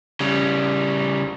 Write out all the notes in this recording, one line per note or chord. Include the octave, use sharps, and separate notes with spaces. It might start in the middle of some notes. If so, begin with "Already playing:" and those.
C#3 G3